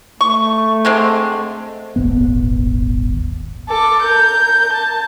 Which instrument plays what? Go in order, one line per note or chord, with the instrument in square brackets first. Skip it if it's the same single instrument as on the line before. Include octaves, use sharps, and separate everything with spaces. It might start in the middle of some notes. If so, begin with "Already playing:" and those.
[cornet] A3 [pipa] C#6
[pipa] D3 G#3 C4
[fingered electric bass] D#1 G#1 B3
[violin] A4 D6
A#4 G6
A5